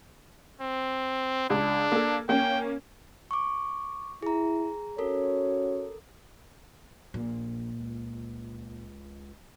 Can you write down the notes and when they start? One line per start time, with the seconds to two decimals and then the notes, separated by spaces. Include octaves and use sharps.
0.61 C4
1.50 C#2 D4
1.92 A#3 A4
2.29 A#3 C#4 G5
3.31 C#6 D6
4.22 E4 G#4 A#5
4.98 C#4 F#4 A4 A#4 C#5
7.14 A#1 A#2
7.80 C#2